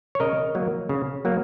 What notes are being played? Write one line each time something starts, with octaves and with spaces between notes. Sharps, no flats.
C#5
C#3 A#4 D#5
F#3 A#3
C#3
F#3 A#3